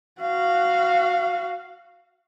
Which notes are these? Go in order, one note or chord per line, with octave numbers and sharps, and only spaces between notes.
F#4 F5